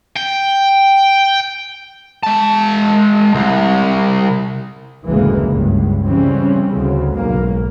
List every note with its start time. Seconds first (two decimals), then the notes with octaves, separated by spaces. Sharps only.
0.17 G5
2.23 G#3 A5
3.34 C2
5.08 F#1 D2 A2 E3 G#3 A#3
5.46 C#2 G2
6.05 C#3 E3 G3 C4 C#4
6.70 D2 C#3
7.15 B1 G#2 A#3